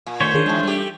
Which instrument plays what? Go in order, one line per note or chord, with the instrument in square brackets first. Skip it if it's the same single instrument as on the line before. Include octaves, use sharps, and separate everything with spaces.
[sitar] A#2
[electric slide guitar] D#3 A3 [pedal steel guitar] C5 C#5 [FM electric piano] B6
[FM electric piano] D#3 G#4 A#4 [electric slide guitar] D4 F4
[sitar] E2 D#3 [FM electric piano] G#3 G#5 A5
[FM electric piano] G3 [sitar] A3 G4